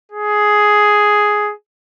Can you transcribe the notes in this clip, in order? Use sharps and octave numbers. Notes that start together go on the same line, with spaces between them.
G#4